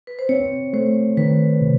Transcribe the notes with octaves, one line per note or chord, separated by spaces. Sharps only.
B4
C5
C4 C#5
A3 C5
D#3 B4
C3